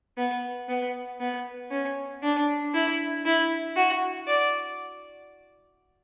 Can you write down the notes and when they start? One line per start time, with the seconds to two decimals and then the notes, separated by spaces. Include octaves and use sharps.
0.18 B3
0.69 B3
1.20 B3
1.71 C#4
2.23 D4
2.74 E4
3.25 E4
3.76 F#4
4.27 D5